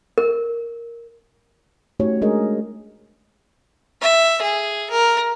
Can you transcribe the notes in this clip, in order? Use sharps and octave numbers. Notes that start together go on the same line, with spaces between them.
A#4
A3 C#4 D#4 F#4 G4 C#5
G#3 D4 G#4 A#4 D#5
E5
G#4
A#4